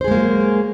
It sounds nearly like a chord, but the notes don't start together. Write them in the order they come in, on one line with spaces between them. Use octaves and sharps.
C5 G#4 G#3 A#3 F#3